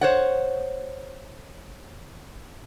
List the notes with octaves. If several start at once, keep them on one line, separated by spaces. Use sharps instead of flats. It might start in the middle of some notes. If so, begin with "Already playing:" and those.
C5 C#5 F#5